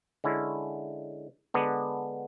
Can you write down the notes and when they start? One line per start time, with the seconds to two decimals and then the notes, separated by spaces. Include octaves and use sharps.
0.24 D3 G#3 C#4 E4
1.54 D3 G#3 B3 D4